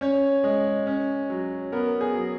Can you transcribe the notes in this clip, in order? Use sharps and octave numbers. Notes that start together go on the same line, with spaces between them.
C#4 C#5
G#3
C#4
F#3
B3 A#4
G#4
F#3